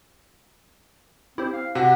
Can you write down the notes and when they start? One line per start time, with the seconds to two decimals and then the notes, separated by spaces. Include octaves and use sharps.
1.38 C4 E4 G4 C5
1.53 F5
1.75 C3 F#4 F#5